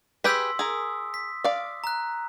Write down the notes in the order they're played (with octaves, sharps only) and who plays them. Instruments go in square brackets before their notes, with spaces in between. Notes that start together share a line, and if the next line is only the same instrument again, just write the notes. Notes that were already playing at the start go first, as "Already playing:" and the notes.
[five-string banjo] G4 G#4 B4 [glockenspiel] C6 E6 B6
[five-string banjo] G#4 A#4 [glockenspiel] D#6
[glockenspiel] B6
[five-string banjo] D5 F5
[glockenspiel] A#5 F#6